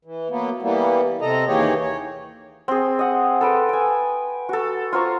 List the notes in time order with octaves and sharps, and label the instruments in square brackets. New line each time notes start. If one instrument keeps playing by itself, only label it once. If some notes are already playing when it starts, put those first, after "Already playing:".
[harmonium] E3
F#3 A#3 B3
E3 G3 A#3 B3
C3 A4 D#5 A#5
D#2 E3 A#3 G4 G#4 C#5
C#5
[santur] C4 G#4
D#5 F#5
A4 B4 G5
G5 G#5
F#4 A4
F4 C5 A#5 C#6